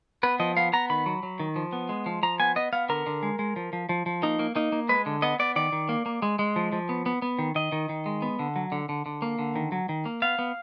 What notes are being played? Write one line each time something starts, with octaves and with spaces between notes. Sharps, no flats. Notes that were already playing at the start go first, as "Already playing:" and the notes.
B3 B4
F3 D#5
B3 F5
B3 A#5
D#3 B5
F#3
F#3
D#3
F3
B3
G#3
F3
F3 A#5
B3 G#5
B3 D#5
B3 F5
D3 A#4
D3
G#3
G#3
F3
F3
F3
F3
A#3 D#4
A#3
A#3 D#4
A#3
G#3 B4
D3
B3 D#5
B3 D5
D#3 D5
D#3
A#3
A#3
G#3
G#3
F3
F3
B3
B3
B3
D#3
D#3 D#5
D#3
D#3
G#3
B3
D3
F#3
D3
D3
D3
A#3
D3
D#3
F#3
D#3
A#3
B3 F5
B3